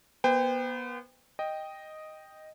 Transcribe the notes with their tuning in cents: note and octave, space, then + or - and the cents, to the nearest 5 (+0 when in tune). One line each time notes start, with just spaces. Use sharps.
B3 -30 C5 -45 G5 +25
D#5 +0 G5 +0